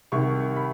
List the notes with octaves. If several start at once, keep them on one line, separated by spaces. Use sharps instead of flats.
C2 C3 D#3 C#6
B5